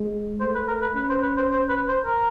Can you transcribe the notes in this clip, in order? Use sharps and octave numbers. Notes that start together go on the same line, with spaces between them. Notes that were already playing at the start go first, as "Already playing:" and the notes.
Already playing: G#3
A3 C5
B4
A#4
B4
C#4 B4
C5
B4
C5
C5
B4
C5
A#4